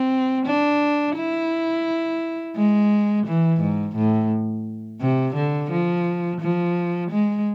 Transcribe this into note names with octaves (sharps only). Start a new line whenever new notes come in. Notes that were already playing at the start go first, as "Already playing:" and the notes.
Already playing: C4
D4
E4
G#3
E3
G#2
A2
C3
D3
F3
F3
G#3